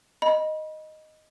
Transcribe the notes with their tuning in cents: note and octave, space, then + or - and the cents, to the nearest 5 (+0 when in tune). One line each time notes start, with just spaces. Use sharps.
D#5 +0 B5 -30